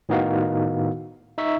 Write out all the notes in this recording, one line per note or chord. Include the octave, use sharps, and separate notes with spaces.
A2 D#3 B3 D#4 F#4 F5
D#4 E5 C#6